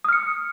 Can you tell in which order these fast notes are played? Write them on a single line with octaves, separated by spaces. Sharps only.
D#6 F6 C#7